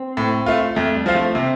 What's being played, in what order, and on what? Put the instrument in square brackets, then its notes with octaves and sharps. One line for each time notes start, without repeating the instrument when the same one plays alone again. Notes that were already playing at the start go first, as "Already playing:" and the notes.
Already playing: [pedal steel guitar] C4
[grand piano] A2
A3 F4
[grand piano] F2 [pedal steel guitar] A3
[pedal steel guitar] G3
[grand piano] F3 C4 F4
[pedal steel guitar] A3
[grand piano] C3 [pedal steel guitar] C4